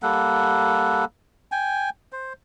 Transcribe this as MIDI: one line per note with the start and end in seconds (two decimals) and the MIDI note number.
0.03 1.05 55
0.03 1.05 58
0.03 1.05 69
0.03 1.05 78
1.52 1.90 79
1.52 1.90 80
2.12 2.33 72